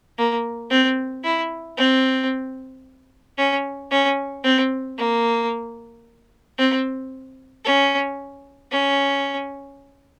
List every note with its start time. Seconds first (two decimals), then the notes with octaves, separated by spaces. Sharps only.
0.18 A#3
0.70 C4
1.24 E4
1.77 C4
3.38 C#4
3.91 C#4
4.44 C4
4.98 A#3
6.58 C4
7.65 C#4
8.71 C#4